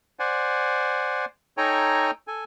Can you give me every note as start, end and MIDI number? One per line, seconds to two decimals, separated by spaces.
0.19 1.25 72
0.19 1.25 74
0.19 1.25 78
0.19 1.25 80
1.58 2.11 63
1.58 2.11 69
1.58 2.11 73
1.58 2.11 79
1.58 2.11 80
1.58 2.11 82
2.27 2.44 69
2.27 2.44 80